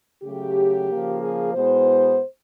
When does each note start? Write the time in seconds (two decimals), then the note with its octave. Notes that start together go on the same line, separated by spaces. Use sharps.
0.24 C#3 F#3 A3 G4
0.90 C#3 F3 A#3
1.23 G#4
1.54 B2 G#3 B3 E4 C5